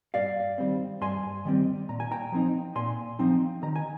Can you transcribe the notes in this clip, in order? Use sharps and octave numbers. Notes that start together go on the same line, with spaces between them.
G2 D5 F5
D#3 G3 C4
G2 G#5 C6
D#3 G3 C4
A#2 A#5
G#5
G5 A#5
F3 C4 D#4
A#2 G#5 C6
F3 C4 D#4
D#3 A#5
G#5